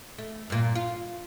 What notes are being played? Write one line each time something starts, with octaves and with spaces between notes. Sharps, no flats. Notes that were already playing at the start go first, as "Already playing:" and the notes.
A3
G2 A#2
F4